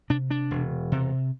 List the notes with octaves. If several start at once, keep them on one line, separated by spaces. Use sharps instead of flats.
C3 D4
D4
E1
C3